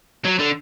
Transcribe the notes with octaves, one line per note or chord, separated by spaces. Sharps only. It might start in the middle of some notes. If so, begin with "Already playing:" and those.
F#3
D3